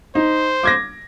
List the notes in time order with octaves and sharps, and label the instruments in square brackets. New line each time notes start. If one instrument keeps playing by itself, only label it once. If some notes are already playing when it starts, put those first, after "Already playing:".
[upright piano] D#4 [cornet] C5
[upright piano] D6 G#6 A#6